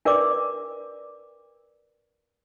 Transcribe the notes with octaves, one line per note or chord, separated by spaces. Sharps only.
D4 A#4 B4 D5 D6